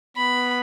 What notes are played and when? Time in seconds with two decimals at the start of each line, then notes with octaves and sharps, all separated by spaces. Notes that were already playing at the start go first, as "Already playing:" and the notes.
0.17 B3 B5